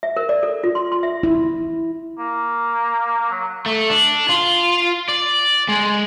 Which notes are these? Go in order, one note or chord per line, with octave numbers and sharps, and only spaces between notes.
E5
A#4
D5
A4
F4
C6
C6
E5
E4
A#3
F#3
A3
D4
F4
D5
G#3